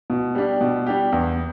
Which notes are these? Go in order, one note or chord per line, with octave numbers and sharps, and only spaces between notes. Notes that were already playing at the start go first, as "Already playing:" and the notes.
B2
G3 D4 G4
B2
G3 D4 G4
E2